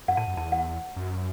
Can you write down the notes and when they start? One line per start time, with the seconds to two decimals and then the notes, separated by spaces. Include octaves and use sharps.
0.08 F#2 F#5
0.17 A2 A5
0.27 F#2
0.37 E2 A5
0.52 F#5
0.96 F#2